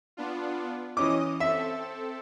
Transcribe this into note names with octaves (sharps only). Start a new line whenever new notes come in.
B3 D4 F4
E3 C#4 D#5 D6 D#6
C4 A4 E5